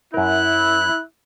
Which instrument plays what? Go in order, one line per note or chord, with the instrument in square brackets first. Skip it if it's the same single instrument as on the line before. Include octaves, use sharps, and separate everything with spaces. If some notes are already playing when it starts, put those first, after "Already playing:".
[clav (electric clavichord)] F#2 A#4 [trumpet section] E4 [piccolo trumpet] F#6